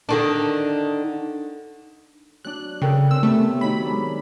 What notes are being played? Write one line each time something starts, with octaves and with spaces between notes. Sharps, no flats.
D3 D#3 D4
F#3 D4 F#6
C#3 A4 A#4 G5
C4 C#4 E6
C3 A3 B3 E6
D#3 F#3 D#4 B5
G#3 D4